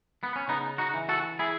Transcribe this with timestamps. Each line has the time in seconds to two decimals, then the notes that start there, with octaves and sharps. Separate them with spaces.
0.23 B3
0.36 C#4
0.49 C#3 B3 D#4
0.78 D#4 F#4
0.94 E3
1.09 F#4 A4
1.39 E4 G#4